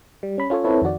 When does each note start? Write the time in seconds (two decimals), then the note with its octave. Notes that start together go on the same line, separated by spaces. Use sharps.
0.23 G3
0.38 C#4 B5
0.50 C#4 F4 A4 C#5
0.64 C4 E4 A4 B4 C#5
0.82 F2 D#3 F#4 D5